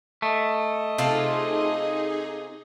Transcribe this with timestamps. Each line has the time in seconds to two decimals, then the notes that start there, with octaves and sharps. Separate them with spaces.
0.22 A3 D#5
0.98 C3 D#4 F4 G#4 A4